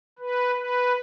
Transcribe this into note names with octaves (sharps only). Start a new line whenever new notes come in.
B4
B4